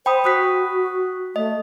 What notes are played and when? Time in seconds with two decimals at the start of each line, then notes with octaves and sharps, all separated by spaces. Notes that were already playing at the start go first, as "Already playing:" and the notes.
0.06 C5 G5 B5 D#6
0.25 F#4 D#6 F#6 B6
1.36 A3 D#5